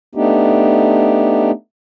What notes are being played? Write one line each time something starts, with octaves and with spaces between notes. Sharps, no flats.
A3 B3 D4 D#4 G4